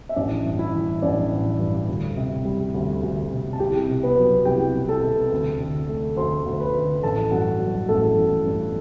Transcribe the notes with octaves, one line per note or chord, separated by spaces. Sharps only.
E5
A1 D4 D5
G2
E4 E5
E3
A1 D4 D5
A1
G2
D2
C3
G3
D2
D2
C3
A5
C2 G4 G5
C3
B3 B4
F#3
C2 G4 G5
C2
A4 A5
C3
D2
D3
A3
D2 C5 C6
D2
B4 B5
D3
A1 A4 A5
G2 F#4 F#5
F#3
A1 A3 A4
A1
G2